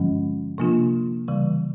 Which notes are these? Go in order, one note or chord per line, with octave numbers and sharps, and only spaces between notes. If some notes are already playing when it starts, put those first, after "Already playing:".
Already playing: G2 D3 F3 G#3 C#4
C3 F3 A#3 D4 F4
C#3 E3 G3